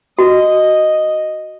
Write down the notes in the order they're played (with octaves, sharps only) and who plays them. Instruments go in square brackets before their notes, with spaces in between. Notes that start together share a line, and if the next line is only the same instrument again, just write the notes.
[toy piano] F#4 [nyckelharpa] D#5